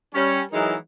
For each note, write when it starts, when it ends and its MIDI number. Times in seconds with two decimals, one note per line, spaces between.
0.14 0.41 55
0.14 0.41 61
0.52 0.74 52
0.52 0.74 54
0.52 0.74 56
0.52 0.74 63
0.52 0.74 70